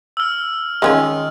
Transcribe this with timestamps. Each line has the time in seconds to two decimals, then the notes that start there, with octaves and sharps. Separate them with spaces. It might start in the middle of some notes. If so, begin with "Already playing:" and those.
0.17 E6 F6
0.82 D#3 G#3 C#4 F4